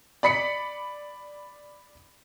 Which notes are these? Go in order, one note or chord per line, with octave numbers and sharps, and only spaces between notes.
D5 B5 B6 C#7